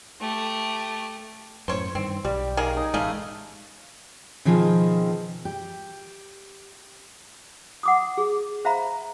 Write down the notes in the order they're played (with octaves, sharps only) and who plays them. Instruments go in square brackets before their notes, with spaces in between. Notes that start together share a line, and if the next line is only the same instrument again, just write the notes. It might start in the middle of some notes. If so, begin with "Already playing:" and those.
[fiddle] A3 G4
[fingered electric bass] F#2 A2 [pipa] C5 C#5
[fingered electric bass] G2 D#3 [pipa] C4
[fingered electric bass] B1 [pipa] G3 [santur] G4
[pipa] D#3 A#3 G#4
[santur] D#4
[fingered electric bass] A1 G#3 [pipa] C#3 A3 G#4 [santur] F5
[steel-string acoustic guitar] B2 D#3 F3 C4 G#4
G4
[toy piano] F#5 D6 D#6
G#4
C5 E5 F5 A#5 B5